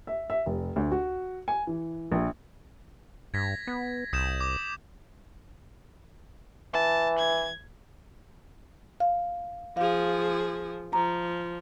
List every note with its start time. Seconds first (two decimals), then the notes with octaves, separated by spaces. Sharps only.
0.07 E5
0.30 E5
0.46 F1
0.76 D2
0.92 F#4
1.48 G#5
1.67 E3
2.12 A#1
3.34 G2 G#6 A#6 B6
3.67 B3
4.13 C2 D#6 G6 E7
4.41 D6
6.74 E3 A5
7.18 G#6
9.00 F5
9.77 F3 G#4 F5
10.93 F3 A#5